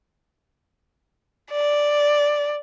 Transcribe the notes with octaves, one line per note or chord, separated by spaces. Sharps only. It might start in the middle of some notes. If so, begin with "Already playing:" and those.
D5